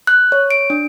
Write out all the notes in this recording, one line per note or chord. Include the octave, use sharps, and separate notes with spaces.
F#6
C#5
D7
D4